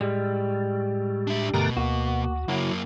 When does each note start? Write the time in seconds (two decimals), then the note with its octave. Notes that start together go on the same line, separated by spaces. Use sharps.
0.01 A2 G3 G#3
1.27 D4 E5
1.54 G2 B2 D3 A3 G4 A#4 A#5
1.77 D2 A#3 F#4
2.48 F#2 C#3 F#3 A#3 E4